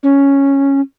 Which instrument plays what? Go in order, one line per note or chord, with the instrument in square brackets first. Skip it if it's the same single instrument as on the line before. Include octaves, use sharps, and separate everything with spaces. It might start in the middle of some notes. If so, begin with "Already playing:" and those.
[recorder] C#4